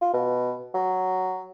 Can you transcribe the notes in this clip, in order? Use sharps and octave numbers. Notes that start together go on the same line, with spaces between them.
F4
B2
F#3